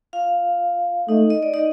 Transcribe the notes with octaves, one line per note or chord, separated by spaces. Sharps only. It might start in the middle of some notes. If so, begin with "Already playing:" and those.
F4 F5
A3 D#4 D#5
D#5
D5
D#4 D#5